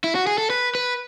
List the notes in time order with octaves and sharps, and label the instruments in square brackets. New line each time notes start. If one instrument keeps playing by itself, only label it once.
[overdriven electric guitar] E4
F#4
G#4
A4
B4
B4